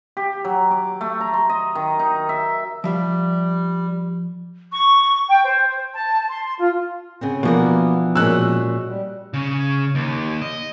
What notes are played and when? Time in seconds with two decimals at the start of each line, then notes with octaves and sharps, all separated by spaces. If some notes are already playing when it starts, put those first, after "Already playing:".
0.17 G4
0.45 F#3
0.71 D6
1.01 A3
1.21 A#5
1.34 C6
1.49 D#5
1.75 D#3
1.99 D#4
2.29 E5
2.84 F3 G3 E5 F5
4.71 C#6
5.28 G5
5.45 C5
5.93 A5
6.29 C6
6.59 F4
7.21 C#3 B3 C4
7.43 B2 E3 F3 A#3 B3 D4 A#4
8.16 A#2 G#3 C#4 F#4 E6 F#6
8.87 G3
9.34 C#3
9.95 D#2
10.42 D#5